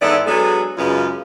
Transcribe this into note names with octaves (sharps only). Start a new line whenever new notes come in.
G#2 E3 B3 A4 D5
F#3 G#3 B3 D4 G#4 A4
F#2 C#3 G#3 B3 F4